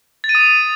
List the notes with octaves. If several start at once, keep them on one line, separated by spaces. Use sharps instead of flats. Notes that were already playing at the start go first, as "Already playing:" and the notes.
A6
D#7
D#6